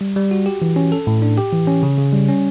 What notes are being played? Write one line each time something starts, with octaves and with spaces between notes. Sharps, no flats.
G3
G3
F#4
G4
E3
C#4
A4
A2
D4
G4
E3
C#4
C#3
C#3
G3
C#4